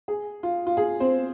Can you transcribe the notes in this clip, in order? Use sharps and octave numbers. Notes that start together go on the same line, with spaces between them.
G#4
F4
F4
G#4
C4 C5